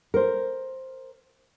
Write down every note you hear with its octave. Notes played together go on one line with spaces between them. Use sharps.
A#4 C5